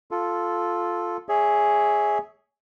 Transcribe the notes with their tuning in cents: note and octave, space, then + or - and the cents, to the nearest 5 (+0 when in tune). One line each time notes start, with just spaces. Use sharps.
F4 +0 A4 -5
G#4 +0 C#5 +20 E5 -15